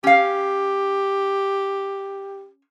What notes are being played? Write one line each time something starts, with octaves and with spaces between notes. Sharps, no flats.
C#4 G4 F5